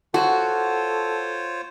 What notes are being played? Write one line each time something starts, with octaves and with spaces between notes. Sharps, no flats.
F4 F#4 A4 C5 C#5